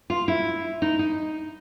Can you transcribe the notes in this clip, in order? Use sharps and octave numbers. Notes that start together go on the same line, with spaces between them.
F4
E4
D#4
D#4